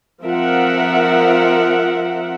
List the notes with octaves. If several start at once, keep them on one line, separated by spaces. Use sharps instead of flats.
F3 C4 A#4 E5 F#5